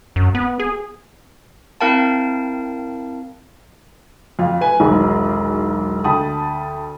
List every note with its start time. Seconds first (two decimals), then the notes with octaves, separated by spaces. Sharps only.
0.16 F#2
0.35 B3
0.60 G#4
1.81 C4 E4 A#4 F5 G5 A5
4.39 F2 F4
4.61 B4 G#5
4.80 E1 B1 D#3 G#4
6.04 D2 G5 A5 B5 D#6